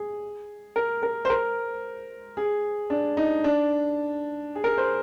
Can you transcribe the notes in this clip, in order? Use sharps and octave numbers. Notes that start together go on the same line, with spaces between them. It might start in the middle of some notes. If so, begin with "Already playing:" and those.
Already playing: G#4
A#4
A#4
C5
A#4
G#4
D4
D#4
D4
G#4
A#4
C5